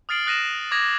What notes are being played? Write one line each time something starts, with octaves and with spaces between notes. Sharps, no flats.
D#6 F6 A6 C7 D7 F#7
D#6 F#6 A#6 D#7 E7
D6 D#6 G#6 A#6